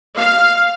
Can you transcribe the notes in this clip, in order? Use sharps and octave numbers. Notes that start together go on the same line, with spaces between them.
F5